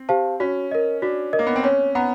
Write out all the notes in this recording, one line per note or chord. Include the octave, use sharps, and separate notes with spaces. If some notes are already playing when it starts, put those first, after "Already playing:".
Already playing: C4
G4 C5 F5 A5
C#4 F#4
A#4 D#5
D4 F#4
A#4 D#5
A#3
B3
C4
C#4 C#5
B3 F#5 A#5